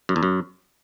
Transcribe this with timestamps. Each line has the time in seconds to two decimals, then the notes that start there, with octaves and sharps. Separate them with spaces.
0.09 F#2
0.16 E2
0.23 F#2